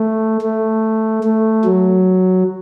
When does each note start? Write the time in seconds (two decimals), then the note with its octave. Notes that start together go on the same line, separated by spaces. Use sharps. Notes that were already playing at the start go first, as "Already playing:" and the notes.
Already playing: A3
0.41 A3
1.23 A3
1.65 F#3